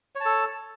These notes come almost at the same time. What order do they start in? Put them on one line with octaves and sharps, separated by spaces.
C#5 A5 A4